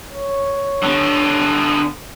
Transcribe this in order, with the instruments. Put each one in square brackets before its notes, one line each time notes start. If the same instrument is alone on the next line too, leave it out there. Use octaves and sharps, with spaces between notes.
[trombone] C#5
[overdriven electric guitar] D3 B3